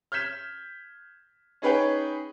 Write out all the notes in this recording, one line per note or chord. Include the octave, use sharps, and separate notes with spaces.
F6 G6 G#6 B6 E7
C#4 D#4 G#4 B4 C#5 G5